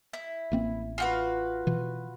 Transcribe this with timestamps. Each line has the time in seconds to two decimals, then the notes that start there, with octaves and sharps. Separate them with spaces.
0.13 E4
0.52 A1 A#3 C4
0.98 F4 F#4 B4
1.67 B2 E3